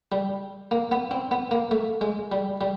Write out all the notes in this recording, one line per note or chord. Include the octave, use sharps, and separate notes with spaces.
G3
A#3
B3
C4
B3
A#3
A3
G#3
G3
G3